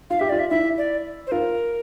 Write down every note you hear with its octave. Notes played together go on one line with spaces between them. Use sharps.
F4 F5
G4 E5
F4 D5
E5
E4 E5
D5
C5
F4 A#4